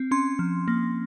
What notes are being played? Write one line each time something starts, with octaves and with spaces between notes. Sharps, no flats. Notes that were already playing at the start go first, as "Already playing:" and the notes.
Already playing: C4
C#4 C6
F3
A#3